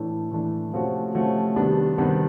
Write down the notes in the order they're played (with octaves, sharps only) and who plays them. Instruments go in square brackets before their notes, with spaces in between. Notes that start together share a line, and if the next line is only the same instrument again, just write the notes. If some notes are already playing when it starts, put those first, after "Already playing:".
Already playing: [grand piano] A2 E3 A3 D4
A2 E3 A3 D4
C3 F3 A3 C#4 F#4
C3 F3 A3 C#4 F#4
C3 D#3 G3 B3 D4
C3 D#3 G3 B3 D4